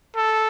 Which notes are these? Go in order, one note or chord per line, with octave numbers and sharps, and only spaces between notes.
A4